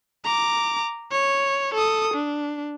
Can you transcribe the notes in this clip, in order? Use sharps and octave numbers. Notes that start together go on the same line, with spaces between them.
A#5 D6
C#5
A4 D#6
D4